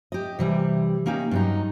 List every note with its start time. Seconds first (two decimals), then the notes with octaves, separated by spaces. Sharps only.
0.12 G4 D#5
0.39 C3 E3 G3
1.06 A#3 C#4 D#4 G4
1.31 G2 F#3 D#4